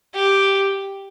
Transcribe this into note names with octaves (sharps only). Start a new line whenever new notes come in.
G4